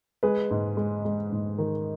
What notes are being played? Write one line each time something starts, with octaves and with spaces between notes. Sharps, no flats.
G#3 G#4 B4
G#2
G#3
G#3
G#2
D#3